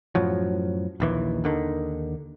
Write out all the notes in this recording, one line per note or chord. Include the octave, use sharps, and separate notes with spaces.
F#2 A2 F3 F#3
A#1 D#2 E3
D#2 D3 D#3